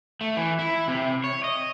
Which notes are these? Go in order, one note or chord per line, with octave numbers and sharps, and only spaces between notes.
A3
E3
E4
C3
C#5
D#5